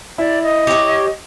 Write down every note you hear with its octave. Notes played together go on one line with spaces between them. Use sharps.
E4 D5
D#5
G4 C#5